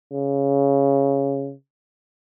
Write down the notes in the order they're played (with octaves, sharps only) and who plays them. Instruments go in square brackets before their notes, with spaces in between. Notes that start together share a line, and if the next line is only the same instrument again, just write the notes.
[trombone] C#3